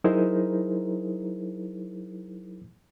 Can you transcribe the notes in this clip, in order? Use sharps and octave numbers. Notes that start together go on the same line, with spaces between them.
F#3 D#4 E4 G#4 A#4 C5